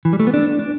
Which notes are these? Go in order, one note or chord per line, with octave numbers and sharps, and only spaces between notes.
E3
G3
A3
B3
D4
D4